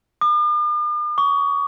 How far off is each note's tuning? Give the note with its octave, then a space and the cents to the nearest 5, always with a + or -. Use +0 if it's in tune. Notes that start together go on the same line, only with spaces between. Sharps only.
D6 +45
C#6 +30